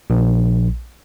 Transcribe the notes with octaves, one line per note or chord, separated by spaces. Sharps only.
A#1